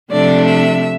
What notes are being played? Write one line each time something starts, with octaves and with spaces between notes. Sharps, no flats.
C3 F3 A3 D4 D5
E5